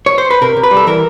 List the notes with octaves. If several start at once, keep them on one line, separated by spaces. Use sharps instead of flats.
C#5
C5
B4
C3 A#4
C3
B4
G3
A4
E3 A#4